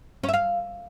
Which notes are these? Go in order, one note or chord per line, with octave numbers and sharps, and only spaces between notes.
C#4
E5
F5